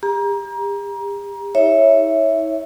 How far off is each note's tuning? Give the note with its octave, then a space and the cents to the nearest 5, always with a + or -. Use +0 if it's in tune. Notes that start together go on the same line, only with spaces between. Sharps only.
G4 +40 A#5 +25
E4 -45 C#5 -5 E5 +0